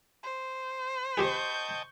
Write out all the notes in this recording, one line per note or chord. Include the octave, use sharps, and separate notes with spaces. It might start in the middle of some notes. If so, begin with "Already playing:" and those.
C5
C4 G4 G#4 D#5 G5 A5 C#6 G6